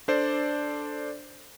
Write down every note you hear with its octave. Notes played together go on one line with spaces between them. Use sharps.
D4 A4 C5 D5